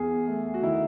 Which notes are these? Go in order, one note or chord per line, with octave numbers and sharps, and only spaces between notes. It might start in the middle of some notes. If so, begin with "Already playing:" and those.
Already playing: E2 G#4
A3
F#4
D#3 E4